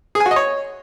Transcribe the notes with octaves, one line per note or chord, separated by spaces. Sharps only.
G#4
G#5
F#4
D#5
C#5